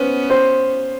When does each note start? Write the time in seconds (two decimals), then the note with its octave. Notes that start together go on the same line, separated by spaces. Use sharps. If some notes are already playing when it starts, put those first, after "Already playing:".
Already playing: B3 C#4 B4 C5
0.30 C5